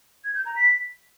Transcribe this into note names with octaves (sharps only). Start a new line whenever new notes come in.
G#6
G6
A#5
B6